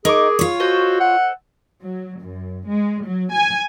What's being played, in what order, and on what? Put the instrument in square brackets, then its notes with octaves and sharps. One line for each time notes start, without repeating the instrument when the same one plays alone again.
[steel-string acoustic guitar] D#4 [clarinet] G#4 [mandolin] A#4 C#6 D6
[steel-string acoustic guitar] F4 C#5
[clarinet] F#4 [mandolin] A4 C5 D#5
[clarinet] F#5
[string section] F#3
F#2
G#3
F#3
G#5